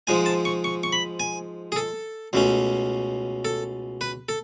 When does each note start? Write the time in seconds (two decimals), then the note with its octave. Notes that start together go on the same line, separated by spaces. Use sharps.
0.07 G#2 F3 G#3 G#5
0.26 A5
0.45 C#6
0.64 C#6
0.83 C#6
0.93 B5
1.20 G#5
1.72 G#4
1.76 A4
2.33 C#2 B2 A3 C#4
3.45 A4
4.01 B4
4.29 A4